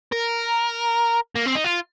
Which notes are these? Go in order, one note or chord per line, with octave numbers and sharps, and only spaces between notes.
A#4
A#3
C4
D#4
F4